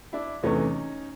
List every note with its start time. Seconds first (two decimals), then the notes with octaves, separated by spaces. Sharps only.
0.13 D4 E4
0.43 E2 C3 E3 A3 C#4 D#4